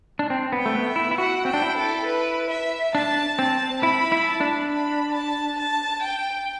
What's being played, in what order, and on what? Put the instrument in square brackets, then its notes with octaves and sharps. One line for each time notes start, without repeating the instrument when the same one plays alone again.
[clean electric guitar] D4
C4
B3
[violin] G5
[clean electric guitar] A3
B3
[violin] E5
[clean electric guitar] E4
E4
[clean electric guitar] F#4 [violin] F#5
[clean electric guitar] C4
[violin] G5
[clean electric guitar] D4
E4
[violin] A4
B4
E5
[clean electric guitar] D4 [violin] A5
[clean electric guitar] C4 [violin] A5
[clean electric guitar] E4 [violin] B5
[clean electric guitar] E4
[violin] A5
[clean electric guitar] D4
[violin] B5
A5
A5
G5